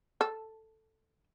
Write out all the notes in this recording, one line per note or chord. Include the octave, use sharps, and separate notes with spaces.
A4